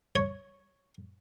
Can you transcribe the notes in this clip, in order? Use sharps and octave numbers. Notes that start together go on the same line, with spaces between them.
C#5